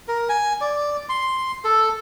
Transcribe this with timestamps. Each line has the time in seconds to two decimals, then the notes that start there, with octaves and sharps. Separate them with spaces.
0.08 A#4
0.29 G#5
0.61 D5
1.09 C6
1.64 A4